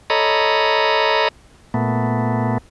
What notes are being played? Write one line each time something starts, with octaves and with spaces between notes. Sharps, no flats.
A4 C#5 D#5 A#5 B5
A#2 A3 B3